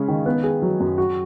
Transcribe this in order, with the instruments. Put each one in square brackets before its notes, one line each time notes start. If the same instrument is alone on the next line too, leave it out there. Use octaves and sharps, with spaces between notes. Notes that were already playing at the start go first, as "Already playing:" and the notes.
Already playing: [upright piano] C#3 G#3 C#4
D#3
B3
G#4
F#3
F#2
F#4